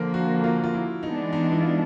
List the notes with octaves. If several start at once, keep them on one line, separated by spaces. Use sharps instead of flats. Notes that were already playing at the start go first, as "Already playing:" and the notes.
Already playing: D3 F3 A#3 A#4
F#4
F4
F4
E4
E3 G#3 B3 D4 D#4
D#4
E4
F4